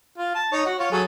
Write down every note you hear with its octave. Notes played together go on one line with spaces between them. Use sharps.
F4
A5
D#4 C#5
F#4
F4 C#5
F#3 G#4 A4